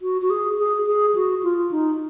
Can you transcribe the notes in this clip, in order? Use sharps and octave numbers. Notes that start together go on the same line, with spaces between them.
F#4
F#4
G#4
G#4
G#4
F#4
F4
D#4